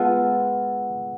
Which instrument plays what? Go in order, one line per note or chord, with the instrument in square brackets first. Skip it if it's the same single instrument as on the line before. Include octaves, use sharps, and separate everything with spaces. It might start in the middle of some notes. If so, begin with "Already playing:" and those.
Already playing: [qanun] G#3 B3 F4 A4 [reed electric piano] F#5